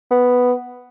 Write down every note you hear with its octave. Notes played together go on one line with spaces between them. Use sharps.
B3